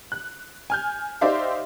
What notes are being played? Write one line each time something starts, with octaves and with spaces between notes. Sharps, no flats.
F#6
G#5 F6 G6
D#4 G4 C5 D5 E5 F5